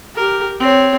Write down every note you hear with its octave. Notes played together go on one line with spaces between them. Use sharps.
G4 A#4
C4 C#5